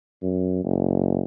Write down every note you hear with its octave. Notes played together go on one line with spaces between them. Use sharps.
F#2
F#1